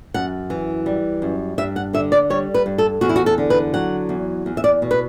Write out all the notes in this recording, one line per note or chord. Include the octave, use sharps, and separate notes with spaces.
F#2 F#5
E3
G3
F#2
G2 E5
F#5
D3 E5
D5
G3 C#5
B4
G2
A4
E2 F#4
E4
F#4
A4
D3
B4
F#3 F#5
E2
E2
E5
D5
B2
B4